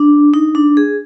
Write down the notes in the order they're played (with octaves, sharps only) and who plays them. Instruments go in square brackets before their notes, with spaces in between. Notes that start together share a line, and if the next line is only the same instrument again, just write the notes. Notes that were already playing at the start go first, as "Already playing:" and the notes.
Already playing: [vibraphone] D4
D#4
D4
G#4